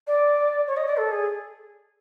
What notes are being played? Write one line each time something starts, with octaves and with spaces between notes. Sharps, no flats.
D5
C#5
D#5
D5
A4
G#4